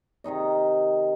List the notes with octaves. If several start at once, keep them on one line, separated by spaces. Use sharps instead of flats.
C3 D#3 D#4 D#5